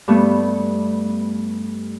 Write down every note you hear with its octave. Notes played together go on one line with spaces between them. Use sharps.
G2 A3 B3